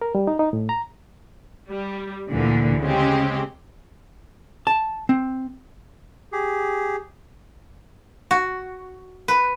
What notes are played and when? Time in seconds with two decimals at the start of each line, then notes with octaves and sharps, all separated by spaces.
0.02 A#4
0.15 G3
0.27 D#4
0.39 D#4
0.53 A2
0.69 A#5
1.68 G3
2.31 D2 A#2 D3 E3
2.81 C#3 G#3 C4 G4
4.67 A5
5.09 C4
6.32 G4 G#4
8.31 F#4
9.28 B4